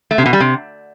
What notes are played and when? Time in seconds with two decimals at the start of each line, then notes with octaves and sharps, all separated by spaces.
0.11 A3
0.18 C3
0.26 B2
0.33 G3
0.40 C3